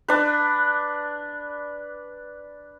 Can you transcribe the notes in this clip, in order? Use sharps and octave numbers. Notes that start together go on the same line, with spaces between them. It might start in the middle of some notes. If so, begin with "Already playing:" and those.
D4 B4